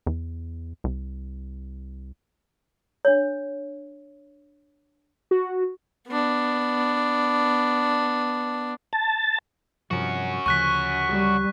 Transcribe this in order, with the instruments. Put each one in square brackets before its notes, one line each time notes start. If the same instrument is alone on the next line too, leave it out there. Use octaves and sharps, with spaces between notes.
[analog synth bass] E2
C2
[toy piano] D4 C#5
[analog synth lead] F#4
[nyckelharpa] B3 D4
[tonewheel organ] A5
[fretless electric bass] G2 C3 F3 [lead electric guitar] C#4 F#4
[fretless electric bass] D2 C#3 F3 [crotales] C#6 F#6 B6
[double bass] G3